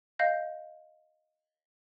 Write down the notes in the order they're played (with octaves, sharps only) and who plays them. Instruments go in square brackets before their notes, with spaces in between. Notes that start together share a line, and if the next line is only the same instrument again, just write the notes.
[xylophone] D#5 F5 G6 A#6